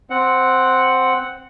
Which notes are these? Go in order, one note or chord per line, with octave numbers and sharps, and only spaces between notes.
C4 F#5